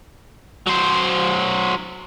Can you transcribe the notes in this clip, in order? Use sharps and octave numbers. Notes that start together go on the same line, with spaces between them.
F#3 C5